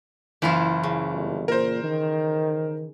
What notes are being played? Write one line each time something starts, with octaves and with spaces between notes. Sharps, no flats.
F#1 E3 E4 F4
C#3
G1
A#2 A#4 C5
D#3